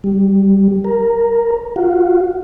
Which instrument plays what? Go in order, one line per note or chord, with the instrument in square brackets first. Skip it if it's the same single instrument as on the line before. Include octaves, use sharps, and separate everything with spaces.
[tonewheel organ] G3
A#4
F4 F#4